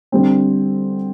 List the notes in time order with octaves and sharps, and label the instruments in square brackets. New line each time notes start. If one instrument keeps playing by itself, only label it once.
[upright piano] D3 G3 C4